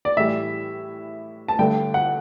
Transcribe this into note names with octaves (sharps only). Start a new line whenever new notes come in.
D5
A2 E3 G3 E5
A5
G2 D3 A3 D4 G5
F#5